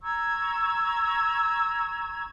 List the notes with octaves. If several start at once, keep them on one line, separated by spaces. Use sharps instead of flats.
A#5 C#6 E6 G#6